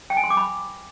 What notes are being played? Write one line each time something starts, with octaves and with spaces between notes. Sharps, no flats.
G5
G#5
C6
D6
B5